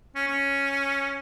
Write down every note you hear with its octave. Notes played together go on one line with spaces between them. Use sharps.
C#4
C#4